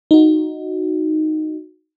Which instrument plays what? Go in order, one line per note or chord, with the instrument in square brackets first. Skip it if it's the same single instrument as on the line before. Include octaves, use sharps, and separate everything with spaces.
[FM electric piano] D#4 F#4